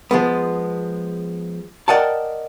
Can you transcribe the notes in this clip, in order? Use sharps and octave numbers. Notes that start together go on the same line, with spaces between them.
F3 G#3 B3
A#4 D5 D#5 F#5 G5 A5